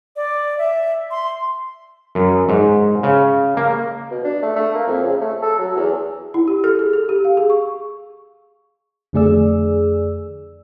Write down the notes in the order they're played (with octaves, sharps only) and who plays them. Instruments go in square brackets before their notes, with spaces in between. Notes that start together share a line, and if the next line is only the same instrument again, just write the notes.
[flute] D5
E5
C6
[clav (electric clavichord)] F#2
G#2
C#3
A#3
[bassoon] B2
D4
A3
A3
A#3
F2
C#3
A3
A4
F#3
E2
[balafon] E4
G4
A4
G#4
A4
G4
F5
G#4
C#6
[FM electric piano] F2 D3 A3 G#4 D5 E6